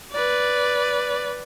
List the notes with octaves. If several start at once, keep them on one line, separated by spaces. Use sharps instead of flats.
B4 D5